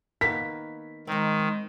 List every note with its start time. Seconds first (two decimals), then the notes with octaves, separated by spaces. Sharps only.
0.21 D#3 A#3 B3 B6
1.07 D#3 G#3 C4 D#4